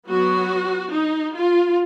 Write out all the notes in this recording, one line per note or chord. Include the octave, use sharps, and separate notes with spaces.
F#3 B3 F#4
D#4
F4